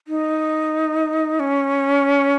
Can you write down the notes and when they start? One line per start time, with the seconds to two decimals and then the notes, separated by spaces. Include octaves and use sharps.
0.08 D#4
1.40 C#4